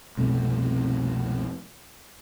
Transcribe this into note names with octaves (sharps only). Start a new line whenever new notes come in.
C2 F2 B2 A3